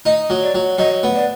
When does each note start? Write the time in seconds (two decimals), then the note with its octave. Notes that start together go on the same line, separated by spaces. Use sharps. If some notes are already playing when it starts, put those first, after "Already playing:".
0.06 D#4 D#5
0.30 F#3
0.42 D5
0.55 F#3
0.78 F#3 D#5
1.03 B3
1.15 D5